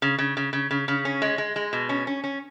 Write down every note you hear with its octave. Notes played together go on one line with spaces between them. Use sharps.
C#3
C#3
C#3
C#3
C#3
C#3
C#4
G#3
G#3
G#3
B2
C#4
C#4
C#4